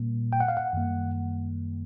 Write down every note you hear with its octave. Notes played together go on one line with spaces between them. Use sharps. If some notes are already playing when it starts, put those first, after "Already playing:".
Already playing: A#2 G3 A#3
G5
F#5
F5
F#5
F#2 D#3 G3 A#3